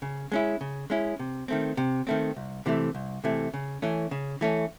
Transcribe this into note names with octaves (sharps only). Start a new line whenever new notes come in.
C#3
G#3 C#4 E4
C#3
G#3 C#4 E4
C3
D#3 A3 C4
C3
D#3 A3 C4
C2
C3 E3 A3
C2
C3 E3 A3
C#3
E3 A3 C#4
C#3
E3 A3 C#4